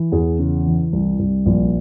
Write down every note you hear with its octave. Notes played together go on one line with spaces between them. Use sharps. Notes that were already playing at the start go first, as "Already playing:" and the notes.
Already playing: E3
E2 G#4
C#3
E3
C2
C2
A#1